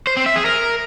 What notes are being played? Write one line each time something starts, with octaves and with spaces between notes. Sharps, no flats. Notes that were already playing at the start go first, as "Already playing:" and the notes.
C5
C4
E5
G#4
A#4